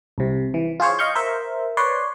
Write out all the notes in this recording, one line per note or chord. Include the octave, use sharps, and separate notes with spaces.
C2 C3
E3
F4 G#4 C5 C#5
D#5 F5 C#6 G6
A#4 C5 E5
B4 C#5 D5 C6